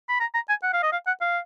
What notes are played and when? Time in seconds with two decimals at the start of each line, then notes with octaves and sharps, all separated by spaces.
0.09 B5
0.20 A#5
0.34 A#5
0.49 G#5
0.63 F#5
0.73 F5
0.83 D#5
0.92 F5
1.07 F#5
1.21 F5